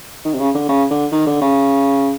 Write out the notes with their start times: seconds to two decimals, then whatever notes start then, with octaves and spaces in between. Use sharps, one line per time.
0.25 D#3
0.33 C3
0.39 C#3
0.55 D3
0.69 C#3
0.91 D3
1.12 D#3
1.27 D3
1.41 C#3